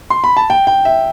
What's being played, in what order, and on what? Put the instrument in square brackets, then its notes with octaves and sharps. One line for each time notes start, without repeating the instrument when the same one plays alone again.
[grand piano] C6
B5
A5
G5
G5
E5